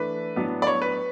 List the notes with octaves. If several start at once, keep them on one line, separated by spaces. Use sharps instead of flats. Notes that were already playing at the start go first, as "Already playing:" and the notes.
Already playing: E3 A3 D4 B4
A2 F#3 B3 D4
D5
C#5
B4